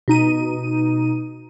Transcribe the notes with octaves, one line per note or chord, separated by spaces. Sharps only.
B2 D#4 D#7